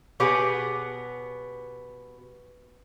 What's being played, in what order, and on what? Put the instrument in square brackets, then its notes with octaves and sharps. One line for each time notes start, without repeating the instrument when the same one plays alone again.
[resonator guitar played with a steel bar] B2 B3 G4 G#4 C#5 F#5